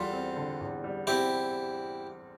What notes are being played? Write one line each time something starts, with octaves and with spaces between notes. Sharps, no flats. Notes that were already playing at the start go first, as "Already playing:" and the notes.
Already playing: E2 G3 F4 A4
C4
D3
E2
G3
C4 E4 G4